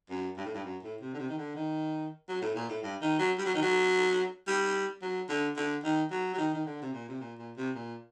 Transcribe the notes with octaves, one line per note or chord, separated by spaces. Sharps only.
F#2
G2
A2
G2
F#2
A2
C3
D3
C3
D#3
D3
D#3
F#3
A2
A#2
A2
G2
D#3
F#3
G3
F#3
D#3
F#3
G3
F#3
D3
D3
D#3
F#3
F#3
D#3
D#3
D3
C3
A#2
C3
A#2
A#2
C3
A#2